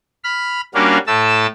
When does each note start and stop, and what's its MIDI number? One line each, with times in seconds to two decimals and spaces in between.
0.24 0.61 83
0.24 0.61 89
0.75 0.98 55
0.75 0.98 58
0.75 0.98 61
0.75 0.98 62
0.75 0.98 66
0.75 0.98 77
1.07 1.47 45
1.07 1.47 57
1.07 1.47 81
1.07 1.47 88